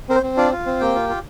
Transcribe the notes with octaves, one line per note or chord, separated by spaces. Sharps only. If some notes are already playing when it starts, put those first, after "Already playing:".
C4 A#4
C5
C4
D4 F4 D5
F4
C4
A#3 G4 G5
F4
F4